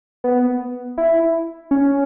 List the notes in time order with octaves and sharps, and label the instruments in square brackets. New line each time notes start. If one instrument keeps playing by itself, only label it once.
[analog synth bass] B3
E4
C#4